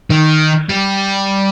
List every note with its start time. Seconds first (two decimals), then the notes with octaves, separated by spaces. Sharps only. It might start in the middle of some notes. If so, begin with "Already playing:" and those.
0.10 D#3
0.70 G3